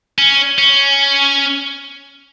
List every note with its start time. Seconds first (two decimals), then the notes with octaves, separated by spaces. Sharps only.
0.18 C#4
0.58 C#4